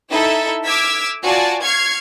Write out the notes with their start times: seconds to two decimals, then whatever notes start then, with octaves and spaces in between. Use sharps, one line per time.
0.11 D#4 E4 A4 E5
0.65 D6 E6 F6 G#6 B6
1.23 F4 F#4 D5 G#5 A5
1.62 C#6 F6 G#6 C7